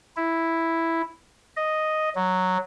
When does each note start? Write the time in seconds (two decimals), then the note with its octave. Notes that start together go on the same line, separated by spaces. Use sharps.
0.17 E4
1.57 D#5
2.15 F#3